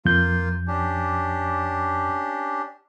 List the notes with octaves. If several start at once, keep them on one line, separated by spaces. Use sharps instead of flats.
F2 A#3 F4 G6
C#4 D4 G4